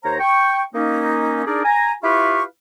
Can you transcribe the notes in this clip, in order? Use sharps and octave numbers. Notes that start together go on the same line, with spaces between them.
D#2 C5 C#5 A#5
G5 C#6
A#3 C#4 D#4
D4 D#4 G#4 A#4 D5
G#5 A#5
E4 F4 G4 B4 F5 C#6